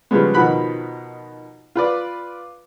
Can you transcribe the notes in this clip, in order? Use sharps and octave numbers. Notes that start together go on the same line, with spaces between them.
C#3 F3 G3 G#3 B3
B2 D#3 F3 B5 F#6
F4 B4 D5